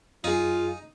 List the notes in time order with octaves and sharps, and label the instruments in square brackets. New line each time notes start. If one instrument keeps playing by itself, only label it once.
[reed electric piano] F#2 G#4 [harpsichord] D#4 [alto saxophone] F4